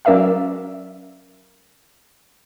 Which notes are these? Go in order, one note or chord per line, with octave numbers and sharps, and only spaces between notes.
F#3 C#4 A#4 D5 E5 F5